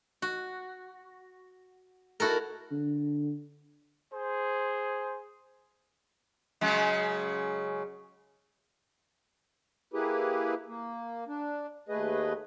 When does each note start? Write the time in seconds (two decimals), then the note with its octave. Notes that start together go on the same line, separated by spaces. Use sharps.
0.22 F#4
2.20 E4 F#4 A4 A#4
2.72 D3
4.13 G#4 C5
6.61 C#3 F#3 G#3
9.93 A#3 E4 G4 G#4 B4
10.68 A#3
11.28 D4
11.89 D#2 A3 G#4 B4 D#5